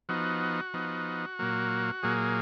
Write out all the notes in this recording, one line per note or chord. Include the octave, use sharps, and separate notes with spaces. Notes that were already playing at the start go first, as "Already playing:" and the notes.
F3 B3 D#4 F#4
F3 B3 D#4
A#2 F#3 A#3
A#2 F#3 A#3 G#4